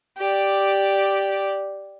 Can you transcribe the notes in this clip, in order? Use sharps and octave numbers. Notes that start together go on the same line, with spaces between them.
G4 D5